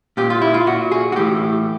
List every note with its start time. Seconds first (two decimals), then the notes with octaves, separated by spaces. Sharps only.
0.17 A#2 G4
0.30 F4
0.42 E4
0.54 F4
0.67 A#2 F#4
0.92 G#4
1.12 F#4
1.16 A2 E3 G4